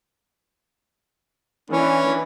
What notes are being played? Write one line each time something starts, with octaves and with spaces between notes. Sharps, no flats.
E3 C#4 D4